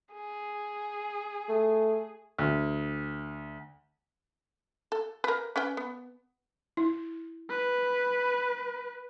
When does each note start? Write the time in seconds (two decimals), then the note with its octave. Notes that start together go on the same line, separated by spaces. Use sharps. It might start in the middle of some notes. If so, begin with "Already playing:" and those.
0.13 G#4
1.49 A3
2.38 D2
4.92 A4
5.24 A#4 B4
5.56 C#4 B4 G5
5.77 B3
6.77 E4
7.50 B4